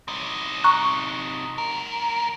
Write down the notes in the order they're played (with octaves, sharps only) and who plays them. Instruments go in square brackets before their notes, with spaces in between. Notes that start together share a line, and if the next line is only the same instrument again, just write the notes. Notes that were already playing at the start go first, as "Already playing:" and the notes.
[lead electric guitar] C3 D#4
[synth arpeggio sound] A#5 C#6 F#6
[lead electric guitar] D2 A#4